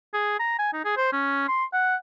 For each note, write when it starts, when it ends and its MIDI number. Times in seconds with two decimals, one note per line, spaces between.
0.14 0.35 68
0.40 0.54 82
0.59 0.72 80
0.73 0.80 63
0.85 0.93 68
0.97 1.11 72
1.12 1.47 61
1.48 1.65 84
1.73 1.95 78